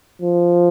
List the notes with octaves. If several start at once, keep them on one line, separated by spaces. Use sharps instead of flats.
F3